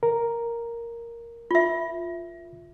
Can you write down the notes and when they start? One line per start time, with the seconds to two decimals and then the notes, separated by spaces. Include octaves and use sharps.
0.03 A#4
1.51 F4 E5